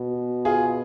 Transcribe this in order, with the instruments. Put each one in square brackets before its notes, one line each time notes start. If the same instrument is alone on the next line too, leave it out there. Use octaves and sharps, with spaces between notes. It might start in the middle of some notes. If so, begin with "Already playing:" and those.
Already playing: [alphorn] B2
[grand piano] F4 G#4